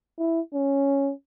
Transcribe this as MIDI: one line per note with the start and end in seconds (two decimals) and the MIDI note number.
0.18 0.40 64
0.54 1.12 61